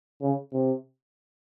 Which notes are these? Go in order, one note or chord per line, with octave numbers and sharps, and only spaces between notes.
C#3
C3